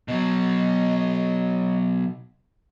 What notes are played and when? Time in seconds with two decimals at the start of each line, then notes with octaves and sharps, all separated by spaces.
0.08 B2 F#3 D#5